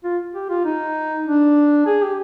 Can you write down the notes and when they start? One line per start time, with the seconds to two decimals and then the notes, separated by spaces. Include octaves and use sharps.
0.04 F4
0.34 G4
0.49 F4
0.65 D#4
1.26 D4
1.86 G#4
2.03 G4